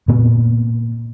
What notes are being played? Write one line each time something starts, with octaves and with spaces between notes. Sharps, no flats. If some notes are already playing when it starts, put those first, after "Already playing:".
A#2 B3